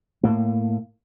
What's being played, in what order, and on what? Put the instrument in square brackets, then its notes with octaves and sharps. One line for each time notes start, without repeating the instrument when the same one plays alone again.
[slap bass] A2 A#3